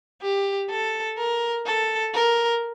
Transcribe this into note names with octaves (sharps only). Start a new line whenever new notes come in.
G4
A4
A#4
A4
A#4